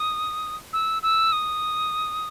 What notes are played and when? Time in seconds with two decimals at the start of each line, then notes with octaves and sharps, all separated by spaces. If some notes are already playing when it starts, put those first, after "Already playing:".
Already playing: D#6
0.73 E6
1.03 E6
1.32 D#6